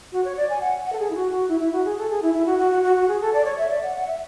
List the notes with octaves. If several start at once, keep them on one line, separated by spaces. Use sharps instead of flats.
F#4
C#5
D5
G#5
F#5
F#5
A4
G#4
E4
F#4
F#4
E4
E4
F#4
G#4
A4
G#4
E4
E4
F#4
F#4
F#4
F#4
F#4
G#4
A4
D5
C#5
E5
D5
F#5
F#5
E5